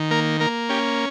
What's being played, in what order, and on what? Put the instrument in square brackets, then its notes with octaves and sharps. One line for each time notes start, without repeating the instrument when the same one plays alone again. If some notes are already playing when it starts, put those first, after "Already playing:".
Already playing: [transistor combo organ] D#3
A#3 A#4
A#3 A#4
C#4 G4